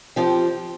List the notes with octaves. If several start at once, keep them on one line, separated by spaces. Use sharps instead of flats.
F3 C4 G4